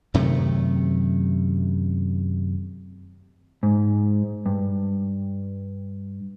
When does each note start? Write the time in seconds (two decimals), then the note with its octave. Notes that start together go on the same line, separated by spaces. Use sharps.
0.14 F#2 C3 D#3 A3
3.63 G#2
4.46 G2